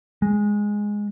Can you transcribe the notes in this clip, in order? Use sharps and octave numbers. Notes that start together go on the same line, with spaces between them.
G#3